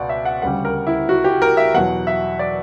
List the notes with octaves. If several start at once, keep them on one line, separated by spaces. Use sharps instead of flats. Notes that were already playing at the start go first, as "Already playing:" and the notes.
Already playing: C#2 B2 D5 F#5
E5
F#5
D2 C#3 G3 F#5
A#4
E4
F#4
G4
A#4
E5
E2 B2 F#3 F#5
E5
D5